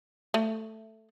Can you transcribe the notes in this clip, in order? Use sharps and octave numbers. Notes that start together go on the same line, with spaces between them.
A3